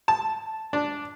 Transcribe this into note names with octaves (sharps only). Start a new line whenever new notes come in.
A5
D4